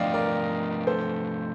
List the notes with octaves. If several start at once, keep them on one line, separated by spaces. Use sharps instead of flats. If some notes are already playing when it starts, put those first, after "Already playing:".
Already playing: F3 A3 D4 D5 D#5 F5 G5
A#4 D5
A4 C5